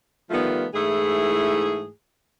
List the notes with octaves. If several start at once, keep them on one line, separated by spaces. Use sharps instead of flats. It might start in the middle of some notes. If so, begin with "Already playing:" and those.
D#3 F3 G3 A3 B3 F4
G#2 E3 A3 E4 G#4